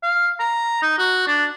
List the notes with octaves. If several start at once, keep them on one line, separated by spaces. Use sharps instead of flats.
F5
A#5
D#4
F#4
D4